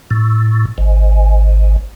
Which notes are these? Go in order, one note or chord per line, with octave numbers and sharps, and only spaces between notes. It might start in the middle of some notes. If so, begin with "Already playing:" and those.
A2
G#1